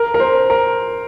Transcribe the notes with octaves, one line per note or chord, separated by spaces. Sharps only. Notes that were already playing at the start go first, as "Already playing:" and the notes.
Already playing: A#4
A#4
C5
A#4